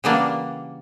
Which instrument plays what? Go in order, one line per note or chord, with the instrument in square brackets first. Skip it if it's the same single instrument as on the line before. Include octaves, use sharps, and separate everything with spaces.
[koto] C#3 E3 F#3 G3 A#3 D4